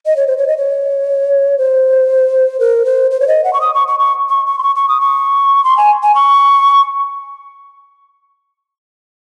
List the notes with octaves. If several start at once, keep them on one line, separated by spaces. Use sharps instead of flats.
D#5
C#5
C5
C#5
D#5
C#5
C5
A#4
C5
C5
C#5
D#5
F#5
C#6
D#6
C#6
C#6
C#6
C#6
C#6
C6
C#6
C#6
D#6
C#6
C6
G#5
G#5
C#6